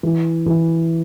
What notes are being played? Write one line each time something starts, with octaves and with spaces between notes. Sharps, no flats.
E3
E3